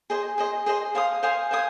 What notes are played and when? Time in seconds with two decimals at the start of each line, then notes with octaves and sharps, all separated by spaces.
0.10 G#4 C5 D#5
0.38 G#4 C5 D#5
0.66 G#4 C5 D#5
0.95 C5 F5 G#5 D#6
1.23 C5 F5 G#5 D#6
1.51 C5 F5 G#5 D#6